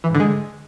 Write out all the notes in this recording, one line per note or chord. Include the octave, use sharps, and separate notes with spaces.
E3
G#2
D3
G#3